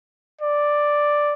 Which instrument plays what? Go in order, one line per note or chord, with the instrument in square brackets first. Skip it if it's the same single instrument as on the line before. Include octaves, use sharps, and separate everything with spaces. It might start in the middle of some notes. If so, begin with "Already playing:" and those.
[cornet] D5